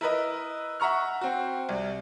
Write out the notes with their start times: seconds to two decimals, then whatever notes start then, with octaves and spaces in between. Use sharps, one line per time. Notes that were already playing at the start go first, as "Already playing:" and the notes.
0.01 E4 A#4 B4 D#5
0.80 E5 F#5 A#5 C#6 F6
1.21 C4 F#4
1.69 C2